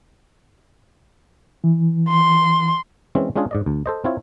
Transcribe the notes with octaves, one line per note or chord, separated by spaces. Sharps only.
E3
C6
E3 G#3 C4 C#4
G#3 C#4 D4 F4 G#4
G#2 D5 D#5
D2
A4 C5 D#5
C4 E4 F4 C#5